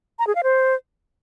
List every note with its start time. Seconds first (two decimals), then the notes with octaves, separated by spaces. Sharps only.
0.19 A#5
0.27 G#4
0.35 F5
0.43 C5